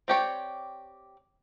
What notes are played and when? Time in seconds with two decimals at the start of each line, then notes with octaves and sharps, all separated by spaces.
0.08 C4 G4 C#5 D5